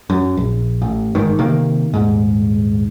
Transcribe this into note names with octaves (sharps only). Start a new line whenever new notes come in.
F#2
A#1
A1
G1 G#2 D#3
C3 D#3 A#3
D#1 G#2